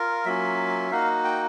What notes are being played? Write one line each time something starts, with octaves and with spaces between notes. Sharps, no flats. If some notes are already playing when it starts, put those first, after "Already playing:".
Already playing: F4 A#4
F#3 A#3 C#4 F4 E5
A#3 D#4 F#4 F5
G5